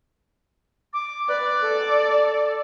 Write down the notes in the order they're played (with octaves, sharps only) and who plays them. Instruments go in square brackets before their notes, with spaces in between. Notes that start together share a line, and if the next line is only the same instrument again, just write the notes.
[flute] D6
[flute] B4 [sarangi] D5
[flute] A4